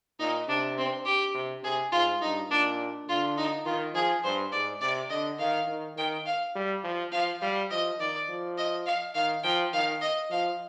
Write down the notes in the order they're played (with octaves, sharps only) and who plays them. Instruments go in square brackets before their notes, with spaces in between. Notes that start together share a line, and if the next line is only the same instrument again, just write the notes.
[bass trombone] A#2 [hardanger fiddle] D#4
[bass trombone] C3 [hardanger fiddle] D4
[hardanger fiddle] C4
G4
[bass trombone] C3
[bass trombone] C3 [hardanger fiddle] G#4
[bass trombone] G#2 [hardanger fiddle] F4
[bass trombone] G2 [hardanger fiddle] D#4
[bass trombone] A#2 [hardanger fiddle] D4
[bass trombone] D3 [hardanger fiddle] F4
[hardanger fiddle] D#4
[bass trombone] D#3 [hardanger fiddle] F4
[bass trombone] F3 [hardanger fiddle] G#4
[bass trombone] G2 [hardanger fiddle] C5
[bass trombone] G#2 [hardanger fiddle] D5
[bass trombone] C3 [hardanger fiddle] D5
[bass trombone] D3 [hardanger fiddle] D#5
[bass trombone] D#3 [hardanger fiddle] F5
[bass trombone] D#3
[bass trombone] D#3 [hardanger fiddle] G5
[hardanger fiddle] F5
[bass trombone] G3
F3
[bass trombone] F3 [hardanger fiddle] F5
[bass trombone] G3 [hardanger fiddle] F5
[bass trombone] F3 [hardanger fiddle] D#5
[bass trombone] D#3 [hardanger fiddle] D5
[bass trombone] F3
[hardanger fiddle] D#5
F5
[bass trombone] D#3 [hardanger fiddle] F5
[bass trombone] F3 [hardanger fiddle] G5
[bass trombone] D#3 [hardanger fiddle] F5
[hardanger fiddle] D#5
[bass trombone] F3 [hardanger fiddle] F5